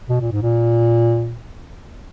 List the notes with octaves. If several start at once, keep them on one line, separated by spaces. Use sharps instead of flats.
B2
A#2
G#2
A#2